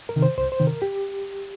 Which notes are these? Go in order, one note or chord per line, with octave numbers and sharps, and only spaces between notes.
A#4
C3 D#3
C5
C2 C5
C5
C3 D#3
A#4
G4